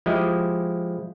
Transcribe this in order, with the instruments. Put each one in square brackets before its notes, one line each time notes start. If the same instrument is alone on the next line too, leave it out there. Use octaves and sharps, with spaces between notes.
[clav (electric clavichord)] F3 G#3 E4 G4 D#5